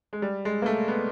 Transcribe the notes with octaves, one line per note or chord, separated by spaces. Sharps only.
G#3
G3
G#3
A#3
A3
B3